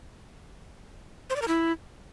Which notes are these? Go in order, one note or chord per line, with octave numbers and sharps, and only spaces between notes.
C5
D5
A#4
E4